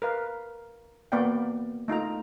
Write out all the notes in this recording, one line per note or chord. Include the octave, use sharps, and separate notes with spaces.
A#4 B4 F5
A#3 B3 D5 F5 G5
A3 D#4 F4 A#5